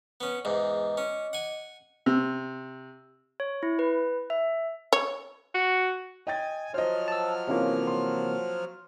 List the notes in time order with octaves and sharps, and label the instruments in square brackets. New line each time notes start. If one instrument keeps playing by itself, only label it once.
[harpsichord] B3 C#4
[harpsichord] E2 G#2 [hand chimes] D#5 D6
[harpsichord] C#4
F#5 G#5
[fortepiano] C3
[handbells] C#5
E4
B4
E5
[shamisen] C#5
[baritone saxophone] F#4
[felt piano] D#5 G5 A6 [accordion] G#5
[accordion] F3 F#3 F6 [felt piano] C5 D#5
[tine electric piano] A5 E6
[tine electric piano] C3 E3 A#3 [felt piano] C#4 F4
[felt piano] C6